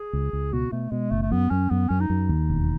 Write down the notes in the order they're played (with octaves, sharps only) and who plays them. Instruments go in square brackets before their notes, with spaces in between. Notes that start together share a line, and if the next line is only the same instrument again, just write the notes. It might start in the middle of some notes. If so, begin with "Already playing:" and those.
Already playing: [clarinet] G#4
[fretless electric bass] C#2
C#2
[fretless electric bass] B2 [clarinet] F#4
[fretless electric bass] B2 [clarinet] A3
[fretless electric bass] B2 [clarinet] G#3
[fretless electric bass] F#1 [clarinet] A3
[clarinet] A3
[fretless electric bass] F#2 [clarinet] B3
[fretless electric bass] F#2 [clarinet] C#4
[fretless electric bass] F#2 [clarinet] B3
[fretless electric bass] F#2 [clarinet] C#4
[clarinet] D#4
[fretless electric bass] F#2
D#2
E1